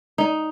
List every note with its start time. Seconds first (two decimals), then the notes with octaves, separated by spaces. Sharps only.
0.18 D#4